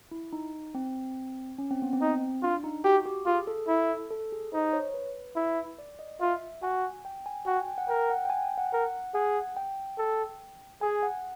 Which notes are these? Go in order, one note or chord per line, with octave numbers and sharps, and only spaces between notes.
E4
D#4
C4
C#4
C4
B3
C4
D#4
D4 F4
D#4
F#4 G4
G4
F4 G#4
A4
E4
A4
G#4
D#4 C5
C#5
B4
E4
D5
D#5
F4 E5
F#4 G#5
G5
G#5
F#4 G5
G#5
G5
F#5
A#4 G5
F#5
G5
G#5
G5
F#5
A#4 F#5
G#4 F#5
G5
A4
G#4 G#5
F#5